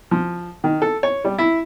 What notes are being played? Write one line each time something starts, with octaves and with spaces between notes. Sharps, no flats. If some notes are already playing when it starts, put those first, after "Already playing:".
F3
D#3
A4
C#5
G3
E4